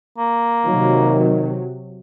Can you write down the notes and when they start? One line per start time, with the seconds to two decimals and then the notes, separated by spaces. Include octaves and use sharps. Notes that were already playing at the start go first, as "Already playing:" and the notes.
0.18 A#3
0.66 C3 D#3 F#3